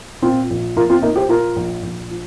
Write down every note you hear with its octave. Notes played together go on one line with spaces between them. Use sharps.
A#2 C4 F4
A#1
A#1 F4 A#4
C4 F4
F3 A#3 D#4
G4 C5
A#2 F4 A#4
A#1
A#1
F3